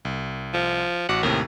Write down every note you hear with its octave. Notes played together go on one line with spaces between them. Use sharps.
C2
F3
A1 F#4 F#5 D6
D#2 A2 C3 A#4